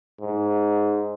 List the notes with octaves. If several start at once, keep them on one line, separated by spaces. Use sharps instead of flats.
G#2